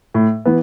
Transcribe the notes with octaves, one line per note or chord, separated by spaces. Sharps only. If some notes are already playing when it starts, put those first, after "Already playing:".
A2
E3 B3